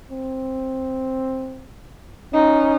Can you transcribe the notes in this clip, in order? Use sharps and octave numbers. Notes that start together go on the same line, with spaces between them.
C4
C#4 D#4